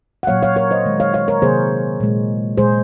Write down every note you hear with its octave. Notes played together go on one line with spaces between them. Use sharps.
F#5
A#2 F#3 A#3 C#5 F5
C#5 F5
A#4 C#5
C5 D#5
D#3 G#3
C#5 F5
C#5 F5
A#4 C#5
C3 D#3 F#3 A#3 G#4 C5
A#2 G#3
A#2 G#3 G#4 C5